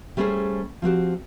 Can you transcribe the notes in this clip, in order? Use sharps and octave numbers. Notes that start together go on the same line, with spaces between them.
G3 A3 C#4 F4 G#4 C5
F3 C4 F#4 G4